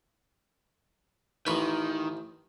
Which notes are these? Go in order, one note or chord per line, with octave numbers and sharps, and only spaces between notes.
A1 D#3 B4